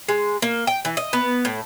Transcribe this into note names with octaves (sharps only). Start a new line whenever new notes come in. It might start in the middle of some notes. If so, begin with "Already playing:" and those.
G#3
A#3
G5
E3
D#5
B3
A2